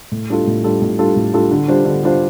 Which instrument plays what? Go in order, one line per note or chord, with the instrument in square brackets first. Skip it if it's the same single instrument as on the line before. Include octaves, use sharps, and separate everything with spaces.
[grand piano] A2
G3 D4 F4 A4
A2
G3 D4 F4 A4
A2
G3 D4 F4 A4
A2
G3 D4 F4 A4
D3
G3 D4 F4 C5
D3
G3 D4 F4 C5